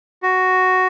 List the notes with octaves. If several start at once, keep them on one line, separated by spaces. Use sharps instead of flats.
F#4